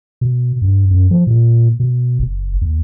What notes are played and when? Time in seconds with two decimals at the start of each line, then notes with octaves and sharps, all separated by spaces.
0.21 B2
0.62 G2
0.91 F#2
1.11 F3
1.27 A#2
1.80 B2
2.19 F#1
2.61 D#2